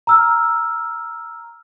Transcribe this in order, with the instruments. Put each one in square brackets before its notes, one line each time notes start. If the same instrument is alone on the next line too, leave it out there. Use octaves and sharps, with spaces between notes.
[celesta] A#5 E6 F6